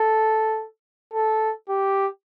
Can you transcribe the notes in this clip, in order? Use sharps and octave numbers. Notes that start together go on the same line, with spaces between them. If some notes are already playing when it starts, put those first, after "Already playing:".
Already playing: A4
A4
G4